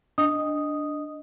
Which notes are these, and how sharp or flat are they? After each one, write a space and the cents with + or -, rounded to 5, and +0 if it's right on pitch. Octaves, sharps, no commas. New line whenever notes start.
D4 +0 D#5 -5 D#6 +0